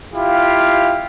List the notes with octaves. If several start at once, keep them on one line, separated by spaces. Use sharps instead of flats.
E4 F4 G4 F5